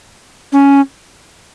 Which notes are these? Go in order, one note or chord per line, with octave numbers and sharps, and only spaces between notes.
C#4